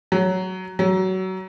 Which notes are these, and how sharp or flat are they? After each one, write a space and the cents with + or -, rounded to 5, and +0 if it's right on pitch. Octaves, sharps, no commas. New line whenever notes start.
F#3 +10
F#3 +25